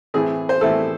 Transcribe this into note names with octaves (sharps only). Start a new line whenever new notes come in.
A2 E3 A3 C4 E4 G#4
C5
A2 E3 A3 C4 E4 A4